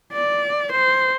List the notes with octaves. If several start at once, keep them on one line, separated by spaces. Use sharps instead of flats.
D5
C5